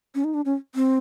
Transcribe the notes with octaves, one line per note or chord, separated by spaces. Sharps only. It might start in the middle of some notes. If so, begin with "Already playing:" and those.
C#4
D#4
D4
C#4
C4